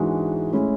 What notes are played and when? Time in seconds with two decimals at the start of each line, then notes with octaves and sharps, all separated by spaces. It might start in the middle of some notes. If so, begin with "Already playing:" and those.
Already playing: G#2 E3 G#3 D4 F#4
0.52 A2 G#3 C#4 E4